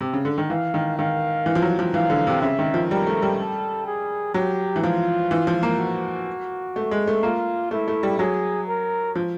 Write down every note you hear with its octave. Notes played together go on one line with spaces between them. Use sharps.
C3
C#3
D3
D#3
E3 F5
D#3
D#3 F5
E3
F3
F#3
F3
E3 F5
D3
C3
C#3 E5
D#3
F3
G3 A#4
A3
G3
A4
G#4
F#3 G4
E3
F3 F4
E3
F3
A#3
F#4
A3
G#3
A3
A#3 F4
A3 E4
A3
G3
F#3 G#4
A#4
F3